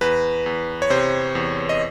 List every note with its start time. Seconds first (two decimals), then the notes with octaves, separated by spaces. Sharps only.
0.01 E2 B4
0.46 E2
0.82 C#5
0.90 C3 C5
1.35 E2
1.69 D#5